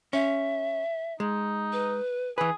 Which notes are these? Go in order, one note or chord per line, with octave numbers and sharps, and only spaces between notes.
C#4 E5
G#3 D#4
B4
E3 G#4 B4